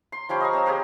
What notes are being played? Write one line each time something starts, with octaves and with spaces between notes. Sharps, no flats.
C6
F3 G3 C#4 G5
D#5 F5 A#5 C#6
C4 C#5 E6
G4 G#4 A#4 C5